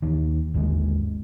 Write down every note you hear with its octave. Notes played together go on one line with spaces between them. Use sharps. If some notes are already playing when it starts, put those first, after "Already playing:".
D#2 D#3
G#1 D#2 D3 G#3